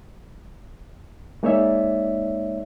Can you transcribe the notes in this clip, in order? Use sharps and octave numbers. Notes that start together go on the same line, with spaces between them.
G#3 A#3 D#4 C#5 D5 E5